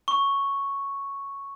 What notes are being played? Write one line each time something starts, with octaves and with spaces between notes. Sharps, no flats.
C#6